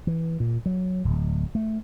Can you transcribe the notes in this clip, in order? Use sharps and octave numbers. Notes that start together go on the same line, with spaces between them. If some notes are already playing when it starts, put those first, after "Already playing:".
E3
A#2
F#3
D1
A3